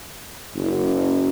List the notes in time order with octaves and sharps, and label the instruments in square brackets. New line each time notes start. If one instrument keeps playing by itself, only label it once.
[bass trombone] F#1